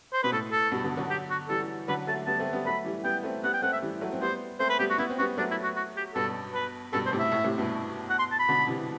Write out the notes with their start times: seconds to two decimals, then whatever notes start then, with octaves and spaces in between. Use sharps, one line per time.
0.13 C5
0.23 B2 B4
0.32 A2 A4
0.52 A4
0.71 G2 B2
0.84 B2 D3
0.97 D3 F#3
1.10 G4
1.30 F#4
1.49 E3 G3 A4
1.88 D3 F#3 B4
2.07 F#3 A3 A5
2.26 G3 B3 A5
2.39 A3 C4
2.53 G3 B3
2.65 F#3 A3 B5
2.85 E3 G3
3.04 G3 B3 G5
3.23 A3 C4
3.44 G3 B3 F#5
3.54 G5
3.62 A3 C4 F#5
3.72 E5
3.82 E3 G3
4.01 F#3 A3
4.12 C4
4.21 G3 B3 C5
4.59 A3 C4 C5
4.69 B4
4.79 G3 B3 G4
4.89 F#4
4.98 B3 E4
5.10 C4
5.18 G3 B3 F#4
5.38 F#3 A3 D4
5.51 E4
5.63 F#4
5.76 F#4
5.97 G4
6.15 G2 B2 A4
6.54 B4
6.93 G2 B2 A4
7.06 C5
7.12 A2 C3
7.19 E5
7.32 A2
7.44 A2 C3
7.58 G2 B2
8.10 F#5
8.19 C6
8.32 A5
8.39 B5
8.49 B2 D3
8.67 C3 E3